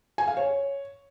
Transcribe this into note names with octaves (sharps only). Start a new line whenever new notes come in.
G#5
F5
C#5